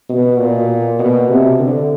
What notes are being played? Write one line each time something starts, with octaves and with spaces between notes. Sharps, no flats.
B2
A#2
B2
C3
D3